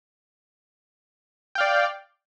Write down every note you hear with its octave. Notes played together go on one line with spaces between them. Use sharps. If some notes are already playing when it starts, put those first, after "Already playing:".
D5 F5 G5